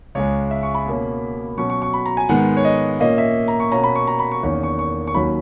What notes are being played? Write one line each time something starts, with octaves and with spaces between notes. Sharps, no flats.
C#2 C#3 G#3 C#5
E5
C#6
B5
B2 A#3 C#4
B2 F#3 C#4 C#6
C#6
C#6
B5
A#5
G#5
G#2 D#3 G#3 B3 F#5
C#5
D#5
A#2 A#3 C#4 D#5
E5
A#5
C#6
B2 A#3 C#4 A#5
B5
C#6
A#5
B5
C#6
E2 D#3 A#3 C#4 C#6
C#6
C#6
C#6
D#2 D#3 F#3 C#4 B5